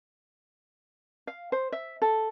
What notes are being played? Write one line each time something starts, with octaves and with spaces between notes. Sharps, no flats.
F5
C5
E5
A4